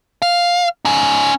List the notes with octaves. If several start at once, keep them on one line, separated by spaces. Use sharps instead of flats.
F5
C#4 D#4